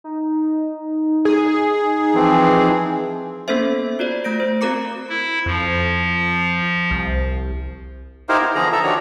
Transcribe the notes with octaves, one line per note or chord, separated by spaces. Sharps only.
D#4
G#4
E3 F3 C4
A#3 B3 C#4 A4 C5 E5
F4 F#4 C5 D5
A3 G6 A#6 D7
C5
C4 F#4 A#4 A#5 D6 C#7
E4
F2 F3
C2
D#4 E4 G4 A#4 C5 F5
B3
D3 E3 F3 G#4 A#5
A4 E5 A#5
D#3 F3 D4 F#4 G4 C#5